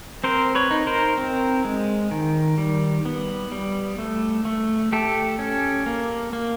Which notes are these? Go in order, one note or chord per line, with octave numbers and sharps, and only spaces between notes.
C4 A#4 C5
B4 C#5
D#4
A#4 C5
C4
G#3
D#3
G3
B3
G3
A3
A3
A3 G4 A4
C#4
A#3
A#3